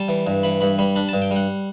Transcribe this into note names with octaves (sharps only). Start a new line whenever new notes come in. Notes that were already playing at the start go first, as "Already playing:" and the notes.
Already playing: G3 A5
E3
G2
E3 B5
G2 B5
G3 B5
D4 B5
G2 A5
G5
G3 F#5